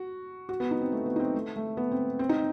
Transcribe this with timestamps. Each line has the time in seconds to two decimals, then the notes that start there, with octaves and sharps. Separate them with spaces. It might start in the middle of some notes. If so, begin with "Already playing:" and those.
Already playing: F#4
0.49 F#4
0.60 B3
0.71 D#4
0.81 C4
0.92 A3
1.06 B3
1.16 D#4
1.20 C4
1.34 A3
1.56 A3
1.77 B3
1.92 C4
2.19 C4
2.29 D#4